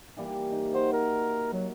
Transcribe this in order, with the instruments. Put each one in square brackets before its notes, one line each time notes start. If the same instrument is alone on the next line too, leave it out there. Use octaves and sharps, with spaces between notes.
[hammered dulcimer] E3 G3 A#3
D#4
[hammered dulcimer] F#4 [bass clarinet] C5
[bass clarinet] A#4
F#3